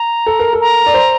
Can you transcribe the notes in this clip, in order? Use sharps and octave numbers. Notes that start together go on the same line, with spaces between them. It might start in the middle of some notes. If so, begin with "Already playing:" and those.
Already playing: A#5
A4
A#4
A4
A#5
D5
C5